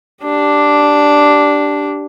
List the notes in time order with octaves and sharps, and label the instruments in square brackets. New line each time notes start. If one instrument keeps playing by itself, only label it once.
[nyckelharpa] D4 G4